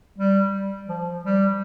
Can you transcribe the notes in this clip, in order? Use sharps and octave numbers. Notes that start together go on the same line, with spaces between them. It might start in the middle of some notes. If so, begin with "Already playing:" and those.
G3
F3
G3